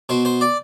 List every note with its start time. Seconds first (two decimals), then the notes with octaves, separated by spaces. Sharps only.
0.09 B2 C5
0.25 C5
0.41 D5